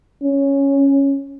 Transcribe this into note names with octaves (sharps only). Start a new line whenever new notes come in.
C#4